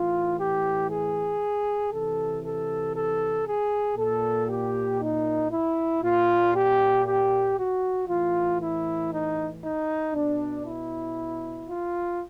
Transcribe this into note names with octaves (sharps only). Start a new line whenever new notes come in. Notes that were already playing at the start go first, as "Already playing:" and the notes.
Already playing: A2 E3 F4
G4
G#4
C3 E3 A4
A4
A4
G#4
A#2 A4
G4
D#4
E4
A#2 F4
G4
G4
F#4
A2 E3 F4
E4
D#4
D#4
B2 D4
E4
F4